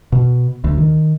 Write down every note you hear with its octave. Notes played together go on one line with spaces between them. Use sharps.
B2
D2
D#3